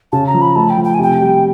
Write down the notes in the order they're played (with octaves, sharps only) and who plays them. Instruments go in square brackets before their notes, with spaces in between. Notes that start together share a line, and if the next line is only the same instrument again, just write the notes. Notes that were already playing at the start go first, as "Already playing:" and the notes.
[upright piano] C#3 [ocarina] A5
[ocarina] A#5
[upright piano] F3
[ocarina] B5
[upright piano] A3 [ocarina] A5
[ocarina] G5
[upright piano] F3
[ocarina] G5
G#5
[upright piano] C3 [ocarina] G5
[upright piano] G3